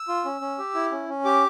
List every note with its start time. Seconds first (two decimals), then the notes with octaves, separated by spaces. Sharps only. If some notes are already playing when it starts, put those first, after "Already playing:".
Already playing: E6
0.08 F4
0.25 C#4
0.41 C#4
0.58 G4
0.75 E4
0.92 C#4
1.09 C#4
1.25 G4 D6